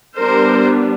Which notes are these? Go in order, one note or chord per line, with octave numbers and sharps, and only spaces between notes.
G3 B3 D4 A#4 C5